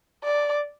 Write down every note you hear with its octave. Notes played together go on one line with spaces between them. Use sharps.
D5